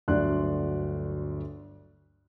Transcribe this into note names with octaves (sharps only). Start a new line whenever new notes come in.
G1 D2 F#3 D5 C6 F#6